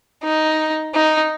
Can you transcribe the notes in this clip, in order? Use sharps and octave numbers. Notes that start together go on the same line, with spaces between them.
D#4
D#4